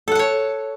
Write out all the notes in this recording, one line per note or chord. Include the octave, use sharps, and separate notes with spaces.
A4 C#5 F#5 A5